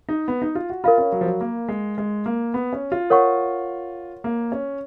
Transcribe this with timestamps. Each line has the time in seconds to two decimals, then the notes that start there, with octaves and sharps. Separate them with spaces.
0.09 D#4
0.28 B3
0.42 D#4
0.55 F4
0.70 F#4
0.84 F4 A#4 F5 B5
0.98 C#4
1.12 F#3
1.21 F3
1.26 F#3
1.41 A#3
1.69 G#3
1.98 G#3
2.26 A#3
2.54 B3
2.73 C#4
2.92 F4
3.10 A#4 C#5 F#5 C#6
4.24 A#3
4.52 C#4